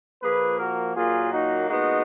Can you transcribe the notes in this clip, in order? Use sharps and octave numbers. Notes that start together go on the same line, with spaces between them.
A#2 F3 A#3 G#4 B4
F#4 A#4
A#2 F#3 A#3 F4 G#4
D#4 F#4
A#2 G#3 B3 D#4 F#4